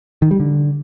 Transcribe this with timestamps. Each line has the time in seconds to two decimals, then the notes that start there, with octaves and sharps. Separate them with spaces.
0.22 D#3
0.31 G3
0.40 D3